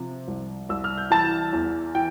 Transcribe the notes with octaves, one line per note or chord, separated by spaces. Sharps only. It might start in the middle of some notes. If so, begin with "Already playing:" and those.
Already playing: C3 F3
C2
C2 E6
F6
G6
E3 A5 A6
E2
E3 G5